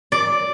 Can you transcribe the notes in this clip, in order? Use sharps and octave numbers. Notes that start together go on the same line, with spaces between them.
D5